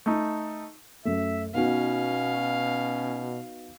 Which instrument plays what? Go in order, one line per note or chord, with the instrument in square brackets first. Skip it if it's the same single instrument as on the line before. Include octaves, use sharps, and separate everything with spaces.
[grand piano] A3 D#4
[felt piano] F#2 A3 [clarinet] E5
[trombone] B2 [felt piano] B3 D#4 F#4 [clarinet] C#4 [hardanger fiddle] F5